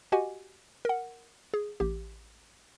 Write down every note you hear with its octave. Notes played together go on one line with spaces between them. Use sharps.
F#4 G4 D#5 F#5 G#5
A#4 F#5
G#4
A1 G4